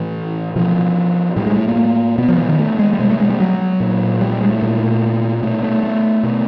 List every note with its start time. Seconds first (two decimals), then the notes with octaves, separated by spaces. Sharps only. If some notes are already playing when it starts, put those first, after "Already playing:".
Already playing: A2 E3
0.56 B2 F3
1.36 A2 G3
1.47 G#3
1.57 A3
1.68 A#3
2.18 B2 B3
2.28 F3
2.38 E3
2.49 D#3
2.59 A3
2.79 G#3
2.93 G3
2.99 B2 G#3
3.10 A3
3.20 G#3
3.30 G3
3.40 F#3
3.80 A#2
4.21 G3
4.31 G3
4.41 G#3
4.51 A3
4.62 A#2
5.43 B2 A3
5.63 A3
5.83 A3
6.23 B2